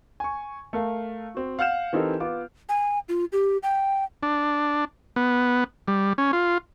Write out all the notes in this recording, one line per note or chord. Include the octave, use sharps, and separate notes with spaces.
G#5 C#6
A3 A#4 F5
C4 F#4
F5 F#5 F6 G6 E7
E3 C4 D#4 G4 A4 A#4
B3 F4 D6
G#5
F4
G4
G5
D4
B3
G3
C#4
F4